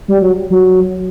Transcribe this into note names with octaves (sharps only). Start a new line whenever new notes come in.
G3
F#3
F#3